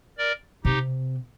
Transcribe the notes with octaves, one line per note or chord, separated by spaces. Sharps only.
A#4 D5
C3 D#4 G4